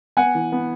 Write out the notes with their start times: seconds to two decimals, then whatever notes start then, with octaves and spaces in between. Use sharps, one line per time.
0.17 B3 F#5 G#5
0.35 E3
0.52 B3